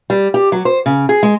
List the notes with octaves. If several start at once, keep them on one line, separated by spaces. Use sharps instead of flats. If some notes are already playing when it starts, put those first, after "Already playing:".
G3
G4
F#3
C5
C#3
G#4
G#3